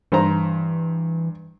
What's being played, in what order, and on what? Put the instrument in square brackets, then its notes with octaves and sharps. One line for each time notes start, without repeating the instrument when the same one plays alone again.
[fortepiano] G2 C5 A#5 [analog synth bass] E3